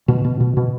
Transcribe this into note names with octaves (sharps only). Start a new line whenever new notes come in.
B2
B2
B2
B2